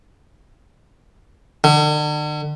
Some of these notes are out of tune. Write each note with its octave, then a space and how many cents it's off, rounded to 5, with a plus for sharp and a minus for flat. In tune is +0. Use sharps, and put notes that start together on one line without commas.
D3 +40